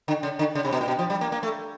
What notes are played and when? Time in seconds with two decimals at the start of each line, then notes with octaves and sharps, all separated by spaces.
0.08 D3
0.23 C#3
0.39 D3
0.55 C#3
0.65 C3
0.72 B2
0.81 A#2
0.88 B2
0.99 F3
1.10 G3
1.21 A#3
1.32 A#3
1.43 A3